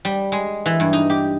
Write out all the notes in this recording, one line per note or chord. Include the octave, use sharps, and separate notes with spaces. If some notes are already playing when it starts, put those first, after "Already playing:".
G3
G#3
E3
G2
D#4
G4